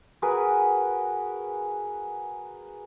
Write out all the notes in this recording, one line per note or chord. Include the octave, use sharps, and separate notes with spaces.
F#4 G#4 A#4 B4